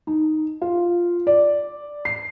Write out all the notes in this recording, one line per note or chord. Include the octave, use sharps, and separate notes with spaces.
D#4
F4
D5
C7